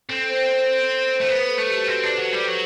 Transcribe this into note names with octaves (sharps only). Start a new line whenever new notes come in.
C4 A4
C5
A3 C5
B3 B4
A4
A3
G4
F#4
C4 G4
D4
F#3
G3
F#3